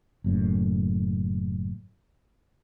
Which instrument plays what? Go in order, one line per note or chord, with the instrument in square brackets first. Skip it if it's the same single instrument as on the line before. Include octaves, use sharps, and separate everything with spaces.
[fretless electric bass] F#1 F#2 A2